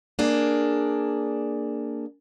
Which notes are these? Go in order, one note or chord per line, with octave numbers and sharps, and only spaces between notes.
A#3 D4 G#4